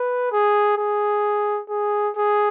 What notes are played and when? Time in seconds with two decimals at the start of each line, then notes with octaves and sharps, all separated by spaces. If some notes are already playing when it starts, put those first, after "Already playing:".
Already playing: B4
0.32 G#4
0.78 G#4
1.69 G#4
2.16 G#4